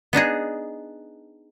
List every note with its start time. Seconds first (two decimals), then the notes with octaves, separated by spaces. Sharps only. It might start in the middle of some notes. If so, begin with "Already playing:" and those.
0.13 B3 D4 D#4 G#4